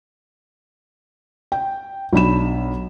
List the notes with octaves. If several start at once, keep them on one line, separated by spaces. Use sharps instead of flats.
G5
B1 D4 B5 E7